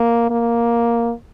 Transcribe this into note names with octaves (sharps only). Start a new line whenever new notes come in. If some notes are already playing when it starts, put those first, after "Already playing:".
Already playing: A#3
A#3